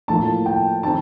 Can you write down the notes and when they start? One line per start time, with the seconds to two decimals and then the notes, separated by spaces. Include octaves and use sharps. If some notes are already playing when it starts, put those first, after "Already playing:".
0.08 A2 F3 A#3 A5
0.46 G5
0.83 D#3 A3 C4 A5